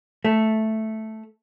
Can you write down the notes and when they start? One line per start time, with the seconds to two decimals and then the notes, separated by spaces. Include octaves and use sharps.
0.25 A3